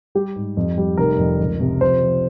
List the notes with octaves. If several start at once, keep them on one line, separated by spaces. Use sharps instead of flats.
G3 G4
G#2
F2
G3
F1 A#4
F2
C#2
C3
F3 C5
F3